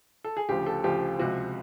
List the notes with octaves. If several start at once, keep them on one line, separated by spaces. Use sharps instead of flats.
A4
G#4
D2 C#3 F3 G4
A4
D2 C#3 F3 G4
C#2 C3 F3 F#4